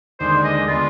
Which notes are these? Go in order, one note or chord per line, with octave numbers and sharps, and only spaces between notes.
D#2 D3 G#3 C5
D#5
D3 G#3 B3 F4